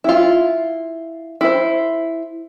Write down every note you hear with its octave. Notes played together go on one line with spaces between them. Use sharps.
E4 F4
E4 C5